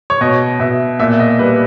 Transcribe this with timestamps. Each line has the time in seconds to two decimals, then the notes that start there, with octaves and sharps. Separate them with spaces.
0.10 C#5
0.21 B2 D#5
0.59 B2 E5
1.00 A#2 E5
1.20 D#5
1.39 G3 B4